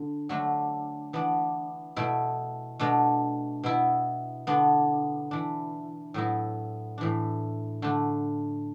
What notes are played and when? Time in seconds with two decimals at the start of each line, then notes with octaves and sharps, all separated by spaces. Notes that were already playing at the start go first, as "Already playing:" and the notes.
Already playing: D3 D4
0.29 D3 F#3 A3 D4
1.13 E3 B3 D4
1.96 B2 A3 E4
2.79 B2 A3 D4
3.63 B2 B3 E4
4.47 D3 B3 D4
5.31 E3 D4
6.14 A2 F#3 B3 E4
6.98 A2 E3 D4
7.82 D3 A3 D4